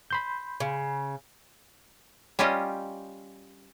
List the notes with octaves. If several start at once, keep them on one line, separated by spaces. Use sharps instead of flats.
B5 C6 G6
C#3
G3 C#4 F4 G4 D#5